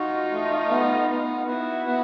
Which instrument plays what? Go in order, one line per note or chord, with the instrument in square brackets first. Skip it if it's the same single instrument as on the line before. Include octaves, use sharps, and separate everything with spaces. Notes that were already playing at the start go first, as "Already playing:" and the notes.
Already playing: [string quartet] D#4 F4 [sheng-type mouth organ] F#4
[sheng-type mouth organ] A3
B3
B3
[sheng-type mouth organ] B3 [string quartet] E4 F#4
[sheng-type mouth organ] B3